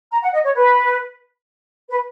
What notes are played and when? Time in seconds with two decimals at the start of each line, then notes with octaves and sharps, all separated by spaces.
0.11 A#5
0.22 F#5
0.33 D#5
0.44 C#5
0.55 B4
1.90 B4